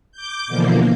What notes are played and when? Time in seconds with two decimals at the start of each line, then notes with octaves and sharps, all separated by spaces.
0.12 D6 G6
0.47 B2 D3 E3 F3 A#3